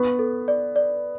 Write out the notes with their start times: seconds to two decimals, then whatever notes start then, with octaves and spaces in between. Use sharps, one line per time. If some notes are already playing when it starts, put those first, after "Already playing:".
Already playing: B3 C#6
0.19 A4
0.48 D5
0.76 D5